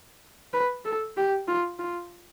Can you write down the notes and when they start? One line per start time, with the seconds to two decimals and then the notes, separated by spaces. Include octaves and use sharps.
0.53 B4
0.85 A4
1.17 G4
1.48 F4
1.79 F4